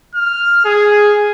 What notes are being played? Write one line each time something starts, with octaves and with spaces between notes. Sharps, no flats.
F6
G#4